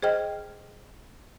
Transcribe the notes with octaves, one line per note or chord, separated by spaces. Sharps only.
G#4 C5 D#5 G5 F6